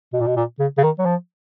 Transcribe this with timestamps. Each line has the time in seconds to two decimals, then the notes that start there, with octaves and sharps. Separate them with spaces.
0.13 B2
0.20 A#2
0.27 B2
0.36 A#2
0.59 C#3
0.78 C#3
0.83 D#3
0.99 F#3
1.05 F3